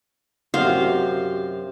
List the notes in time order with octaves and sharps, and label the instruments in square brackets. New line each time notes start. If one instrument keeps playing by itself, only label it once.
[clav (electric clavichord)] F#2 C3 [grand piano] F#4 G4 [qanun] C5 F5